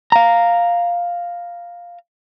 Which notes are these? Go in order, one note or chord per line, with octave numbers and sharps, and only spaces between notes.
F5 A#5